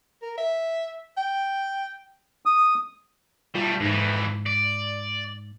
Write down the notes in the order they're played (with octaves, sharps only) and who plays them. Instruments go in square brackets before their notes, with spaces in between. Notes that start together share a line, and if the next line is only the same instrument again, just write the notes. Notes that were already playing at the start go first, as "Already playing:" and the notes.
[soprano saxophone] A#4
E5
G5
[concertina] D#6
[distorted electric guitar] G3 A3 [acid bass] F4
[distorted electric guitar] F2 E3 [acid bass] G#2
[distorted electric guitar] D5